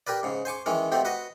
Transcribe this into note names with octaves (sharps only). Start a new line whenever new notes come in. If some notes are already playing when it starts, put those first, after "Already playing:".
G4 A#4 B4 D5
G#2 C#3
C5 G#5 C#6 D6
D#3 E3 G#3 C#4
B2 A3 C4 G4
F#4 B4 D#5